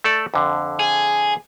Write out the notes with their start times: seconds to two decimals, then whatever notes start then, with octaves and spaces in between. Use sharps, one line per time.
0.04 A3 A4 D5
0.34 F2 D3
0.79 G#4